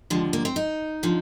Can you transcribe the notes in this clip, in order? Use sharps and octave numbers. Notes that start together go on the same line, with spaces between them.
D#2 D3 F3 G#3
A#3
C4
D#4
D3 F3